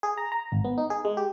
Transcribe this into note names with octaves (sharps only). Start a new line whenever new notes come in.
G#4
A#5
A#5
G#1
B3
D#4
G#4
G#3
G4